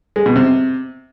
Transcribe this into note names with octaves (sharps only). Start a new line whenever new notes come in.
G#3
B2
C3